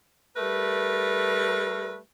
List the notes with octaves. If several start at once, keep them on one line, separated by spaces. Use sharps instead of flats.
G3 A3 A#4 B4